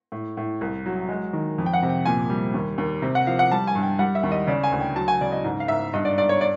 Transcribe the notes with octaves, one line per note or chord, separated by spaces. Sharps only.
A2
A2
C2
F#3
G#3
D#3
F2
G5
F#5
C3
G5
A#2 G#5
G3
D#2
D#2
C3
F#5
F3 F5
F#5
G3 A5
G#5
G2
G5
G3 F#5
E5
D#2
D#5
C#3 D5
G#5
D2
G5
F#3 A5
G#5
C#3 D5
D#5
G#2
F5
G#2 E5
G2 D#5
D5
G2 D5
C#5
D5